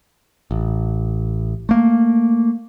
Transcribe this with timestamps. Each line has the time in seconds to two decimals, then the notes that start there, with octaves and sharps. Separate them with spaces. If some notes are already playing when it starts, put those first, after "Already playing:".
0.51 A1
1.69 A3 A#3